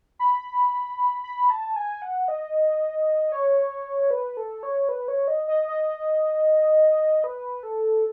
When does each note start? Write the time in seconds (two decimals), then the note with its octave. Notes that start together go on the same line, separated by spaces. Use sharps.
0.19 B5
0.98 B5
1.24 B5
1.50 A5
1.76 G#5
2.02 F#5
2.28 D#5
3.32 C#5
4.11 B4
4.37 A4
4.63 C#5
4.89 B4
5.08 C#5
5.28 D#5
5.48 D#5
5.68 D#5
7.24 B4
7.63 A4